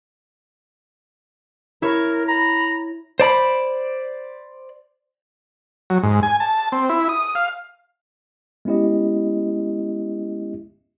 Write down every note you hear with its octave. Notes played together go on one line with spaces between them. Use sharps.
E4 A#4 C#5
A#5 B5
C5 D5 A#5 B5
F#3
G#2
G#5
A5
C4
E4
D#6
F5
G#3 B3 C#4 E4 G4 D#5